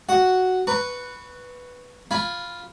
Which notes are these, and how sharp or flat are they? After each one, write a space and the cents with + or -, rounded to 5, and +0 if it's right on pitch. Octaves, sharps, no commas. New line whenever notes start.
F#4 +0 F#5 +0
B4 +0 A#5 -45 C#6 +0
F4 +0 G#5 +5 B5 +0